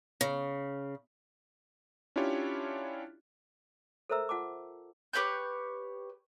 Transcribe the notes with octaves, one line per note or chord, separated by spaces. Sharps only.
C#3
C#4 D4 E4 F4 G4 C#5
A4 A#4 C5 E5 A#5 E6
F4 F#5 A5 D6
G4 B4 C#5 G6